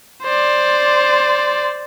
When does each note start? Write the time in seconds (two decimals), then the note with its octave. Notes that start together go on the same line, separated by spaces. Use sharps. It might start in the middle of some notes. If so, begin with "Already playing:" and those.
0.23 C5 D5